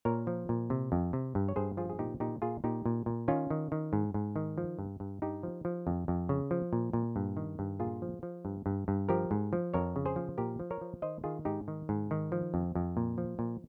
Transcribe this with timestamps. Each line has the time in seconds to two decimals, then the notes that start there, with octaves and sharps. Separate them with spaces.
0.05 A#2 A#4 C#5
0.27 F3
0.49 A#2
0.70 C3
0.92 F2
1.13 C3
1.35 G2
1.49 C#5
1.56 G2 G#4 C5
1.77 F3 F4 G#4
1.90 G#4
1.99 A#2 D#4 G4
2.20 A#2 D#4 G4
2.42 A#2 F4 G#4
2.64 A#2 D#4 G4
2.86 A#2
3.06 A#2
3.28 D#3 C#4 F4
3.50 D#3
3.72 D#3
3.93 G#2
4.14 G#2
4.36 D#3
4.58 F3
4.79 G2
5.00 G2
5.22 G2 D#4 G4
5.43 F3
5.65 F3
5.87 F2
6.08 F2
6.29 C#3
6.51 F3
6.73 A#2
6.93 A#2
7.16 G2
7.37 D#3
7.59 G2
7.80 A#2 F4 G#4
8.02 F3
8.23 F3
8.45 G2
8.66 G2
8.88 G2
9.09 F3 G4 A#4
9.31 G#2
9.53 F3
9.74 F2 A#4 C#5
9.96 C#3
10.06 G#4 C5
10.16 F3
10.38 A#2 G4 A#4
10.60 F3
10.71 A#4 C#5
10.81 F3
11.02 D#3 C5 D#5
11.24 D#3 F4 G#4
11.45 G#2 D#4 G4
11.68 D#3
11.89 G#2
12.11 D#3
12.32 F3
12.54 F2
12.75 F2
12.97 A#2
13.18 F3
13.39 A#2